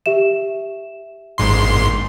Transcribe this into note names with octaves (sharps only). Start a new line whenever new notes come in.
G4 E5 E7
G#1 G#2 C6